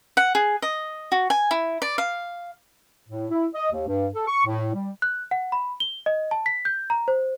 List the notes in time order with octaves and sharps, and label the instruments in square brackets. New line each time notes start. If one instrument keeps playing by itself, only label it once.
[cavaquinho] F#5
G#4
D#5
F#4
G#5
E4
D5
F5
[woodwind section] A2
E4
D#5
D#2
G2
A4
C#6
A2
G3
[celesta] F#6
F#5
B5
G7
D#5
A5
B6
G6
A#5
C5